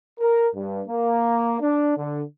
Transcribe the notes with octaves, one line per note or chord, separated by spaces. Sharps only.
A#4
G2
A#3
D4
D3